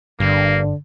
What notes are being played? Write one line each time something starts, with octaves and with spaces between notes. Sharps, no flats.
G1 G2 D3 A#3